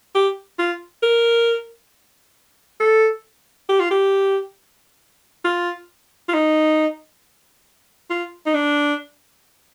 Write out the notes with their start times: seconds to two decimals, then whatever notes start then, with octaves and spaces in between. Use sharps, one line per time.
0.15 G4
0.59 F4
1.03 A#4
2.80 A4
3.69 G4
3.80 F4
3.91 G4
5.45 F4
6.29 F4
6.34 D#4
8.10 F4
8.46 D#4
8.54 D4